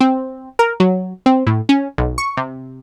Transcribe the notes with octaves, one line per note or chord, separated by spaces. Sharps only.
C4
A#4
F#3
C4
A2
C#4
B1
C#6
C3